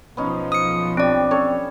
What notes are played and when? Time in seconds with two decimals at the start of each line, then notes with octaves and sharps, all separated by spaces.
0.17 B1 F3 B3 C#4 D#4
0.52 D#6 C#7
0.97 C4 D4 G4 D5
1.31 C#4 A4 C#5